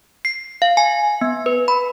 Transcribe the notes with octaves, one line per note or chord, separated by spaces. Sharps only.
C7
F5
G#5
B3
B4
B5